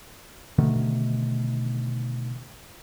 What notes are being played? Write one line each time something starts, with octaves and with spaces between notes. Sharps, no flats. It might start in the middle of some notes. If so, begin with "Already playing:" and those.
B2 D3 D#3 A3